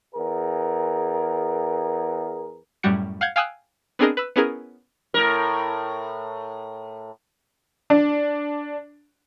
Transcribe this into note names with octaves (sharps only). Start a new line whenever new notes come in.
E2 G#4 A#4
F#2 A2 G3 F#4 C#7
F5 F#5 G6 G#6
F5 G5 G#5 D#6 E6 F#6
B3 C4 D4 G#4 A#4 D#5
B4 E6
B3 C#4 E4 G#4 A#4
A2 A#4
D4